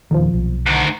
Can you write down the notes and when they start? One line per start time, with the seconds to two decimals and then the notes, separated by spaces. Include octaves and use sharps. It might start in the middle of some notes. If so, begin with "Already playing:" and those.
0.11 D#1 E2 A#2 D#3 F3
0.34 B1
0.66 D2 D#3 F#5